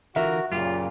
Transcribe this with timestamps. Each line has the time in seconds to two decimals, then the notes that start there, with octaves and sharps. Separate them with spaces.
0.16 D3 E3 F4 F#4 A#4 E5 F#5
0.51 F#2 A#2 C#3 A#3 F4 G4